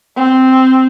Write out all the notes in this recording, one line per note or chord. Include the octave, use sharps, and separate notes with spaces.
C4